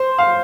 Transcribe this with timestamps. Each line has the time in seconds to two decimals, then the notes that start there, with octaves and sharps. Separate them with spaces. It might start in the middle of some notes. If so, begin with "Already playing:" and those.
Already playing: C5
0.19 F5